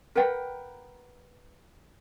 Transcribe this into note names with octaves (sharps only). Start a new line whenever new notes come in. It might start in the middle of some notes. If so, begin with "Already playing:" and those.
A#4 B4 F#5 G5